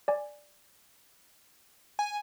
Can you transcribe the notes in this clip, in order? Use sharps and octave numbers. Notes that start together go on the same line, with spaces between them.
D5 G#5
G#5